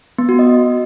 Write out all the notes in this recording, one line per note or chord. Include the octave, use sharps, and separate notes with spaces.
B3
F#4
D#5